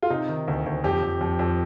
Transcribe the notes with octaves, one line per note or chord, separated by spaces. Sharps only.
F4
C3 D#4
D#3
D2
D2
F2 G4
F2
F2
F2